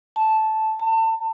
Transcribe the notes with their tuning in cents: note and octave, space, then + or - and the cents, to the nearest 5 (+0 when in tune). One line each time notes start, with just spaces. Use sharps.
A5 -10
A5 +30